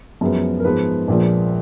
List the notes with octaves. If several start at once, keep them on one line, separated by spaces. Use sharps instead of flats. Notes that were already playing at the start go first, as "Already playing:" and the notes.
F#2 F3 G#3 B3
A#4
G#2 F3 G#3 B3 B4
A#1 A#2 F3 G#3